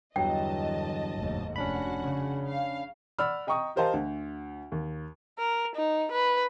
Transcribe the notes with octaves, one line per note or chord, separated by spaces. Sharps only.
E2 G2 D3 F#3 D#5 G5 A5
F1 D#2 G#2
F1 C#4 D4 F#4 F#5 B5
C#3
F5
D5 F#5 B5 E6 F6
D#5 G5 A#5 C#6 D#6
G4 A#4 C5 D#5 F5 A5
D2
D#2
A#4
D#4
B4